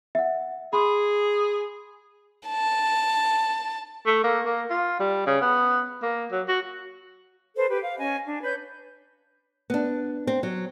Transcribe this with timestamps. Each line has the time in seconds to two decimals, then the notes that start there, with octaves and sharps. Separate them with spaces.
0.15 E5 F#5
0.73 G#4 B5 C6
2.48 A5
4.07 A3
4.24 A#3
4.46 A#3
4.70 F4
5.00 G3
5.26 C#3
5.41 B3
6.02 A#3
6.32 F#3
6.48 F#4
7.55 A4 B4 C5
7.68 G4 B4
7.82 F5
7.98 C#4 D#5 G#5
8.25 D4
8.43 B4 C#5 G6
9.70 B3 D4
10.27 C4
10.43 F#3